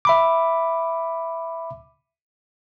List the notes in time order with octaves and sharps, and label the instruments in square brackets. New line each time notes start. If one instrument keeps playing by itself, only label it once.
[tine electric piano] E5 B5 D6